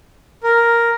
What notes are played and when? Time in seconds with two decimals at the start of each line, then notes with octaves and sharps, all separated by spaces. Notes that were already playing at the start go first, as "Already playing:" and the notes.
0.43 A#4